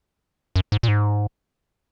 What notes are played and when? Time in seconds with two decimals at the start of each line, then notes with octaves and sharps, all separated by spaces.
0.56 F#2
0.72 G#2
0.83 A#2
0.88 G#2